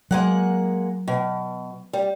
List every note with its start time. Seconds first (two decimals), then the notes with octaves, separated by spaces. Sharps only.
0.11 F#3 G#3 A#3 F#5
1.08 B2
1.93 G3